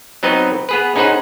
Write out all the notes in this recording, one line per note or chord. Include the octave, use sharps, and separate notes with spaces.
F#3 B3 C4 D#4 B4 D#5
B3 G#4 B4
C#4 D#4 G#4 B4 C5 F#5